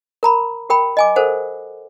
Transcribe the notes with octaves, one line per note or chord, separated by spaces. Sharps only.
A#4 A#5 B5
G4 A#4 G5 B5
D#5 G#5 D6
A4 A#4 C5 F#5